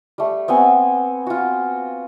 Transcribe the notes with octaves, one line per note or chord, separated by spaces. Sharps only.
G3 A3
B3 C4 F#5 G#5
F4 F#4